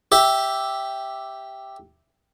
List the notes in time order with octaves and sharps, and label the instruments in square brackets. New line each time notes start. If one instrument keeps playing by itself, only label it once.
[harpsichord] G4 E5